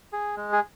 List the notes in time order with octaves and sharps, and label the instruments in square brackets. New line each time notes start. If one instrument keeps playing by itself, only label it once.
[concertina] G#4
G#3
G#4